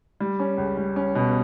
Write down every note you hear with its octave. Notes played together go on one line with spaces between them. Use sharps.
G3
C#4
C#2
G3
C#4
B2